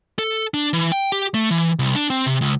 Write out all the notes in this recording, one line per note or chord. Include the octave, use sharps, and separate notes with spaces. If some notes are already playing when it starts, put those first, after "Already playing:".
A4
D4
E3
G5
G4
A3
E3
C2
D4
C4
C3
C#2